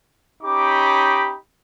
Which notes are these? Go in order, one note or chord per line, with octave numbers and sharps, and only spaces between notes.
C#4 D#4 G4 B5 D6